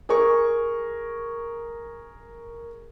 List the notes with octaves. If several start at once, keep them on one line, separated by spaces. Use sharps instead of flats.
G#4 A#4 C#6